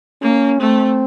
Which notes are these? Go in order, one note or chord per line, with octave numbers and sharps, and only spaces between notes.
A#3 C#4
A3 C4